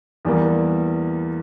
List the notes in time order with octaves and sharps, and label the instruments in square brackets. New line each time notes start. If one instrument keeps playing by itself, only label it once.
[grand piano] E2 E3 G3 A#3